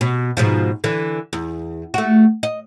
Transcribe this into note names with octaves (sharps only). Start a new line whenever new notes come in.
B2
G#2 B2 F3
D3 E3
E2
A3 F#4
D#5